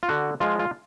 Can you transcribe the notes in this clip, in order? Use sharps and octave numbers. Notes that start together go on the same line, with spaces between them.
F4
D3 F#4
F3 G#3 F4
F4